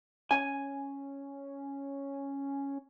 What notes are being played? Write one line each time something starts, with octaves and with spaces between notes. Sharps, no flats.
C#4 G#5